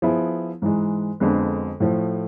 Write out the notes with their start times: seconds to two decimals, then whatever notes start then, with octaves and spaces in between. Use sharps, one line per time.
0.02 F3 B3 E4 G#4
0.62 G#2 E3 G#3
1.20 F2 D3 G#3 B3
1.80 A2 F3 A3